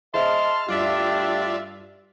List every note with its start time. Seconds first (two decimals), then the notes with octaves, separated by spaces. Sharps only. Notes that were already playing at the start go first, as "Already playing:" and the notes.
0.14 G#4 C5 D#5 E5 A5 C6 F6
0.68 G2 G3 A3 D4 F4 G4 D5 E5